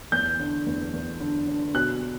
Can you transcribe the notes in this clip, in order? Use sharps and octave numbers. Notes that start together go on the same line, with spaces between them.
E2 G6
D3
E2
E2
D3
D3
B2 F#6